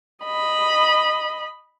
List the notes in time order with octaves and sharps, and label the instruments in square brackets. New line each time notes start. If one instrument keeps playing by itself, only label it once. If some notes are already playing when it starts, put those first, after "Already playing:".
[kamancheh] D#5 B5